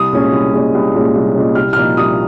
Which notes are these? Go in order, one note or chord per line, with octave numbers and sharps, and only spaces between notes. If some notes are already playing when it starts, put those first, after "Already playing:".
Already playing: C2 D#6
A#2 G#3 C#4
C2
A#2 G#3 C#4
C2
A#2 G#3 C#4
C2
A#2 G#3 C#4
C2 F6
F6
A#2 F3 A#3 D#4
C2 D#6